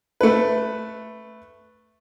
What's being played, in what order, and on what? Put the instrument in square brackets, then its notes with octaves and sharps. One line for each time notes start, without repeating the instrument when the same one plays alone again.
[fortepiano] A3 B4